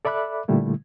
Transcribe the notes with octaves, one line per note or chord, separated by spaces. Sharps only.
A4 D5 E5 B5 D6 F#6
A#2 D3 G3 A3 E4